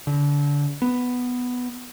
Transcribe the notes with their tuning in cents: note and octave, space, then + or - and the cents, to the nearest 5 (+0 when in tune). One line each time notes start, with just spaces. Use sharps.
D3 -30
B3 +5